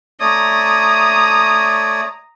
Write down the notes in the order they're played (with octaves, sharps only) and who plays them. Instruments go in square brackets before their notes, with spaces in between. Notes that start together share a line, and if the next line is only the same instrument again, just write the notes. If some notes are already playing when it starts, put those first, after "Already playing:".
[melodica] A3 C#5 D5 [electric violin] A#5 D#6